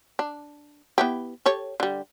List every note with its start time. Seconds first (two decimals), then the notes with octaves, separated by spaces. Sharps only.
0.19 D4
0.98 B3 E4 G4
1.46 G4 A4 C#5
1.80 D3 G3